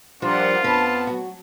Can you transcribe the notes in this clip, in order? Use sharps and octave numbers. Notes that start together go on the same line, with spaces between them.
F3 G3 D4 F4 A#4 F#5
F2 B3 B4 A5
F#3 F#4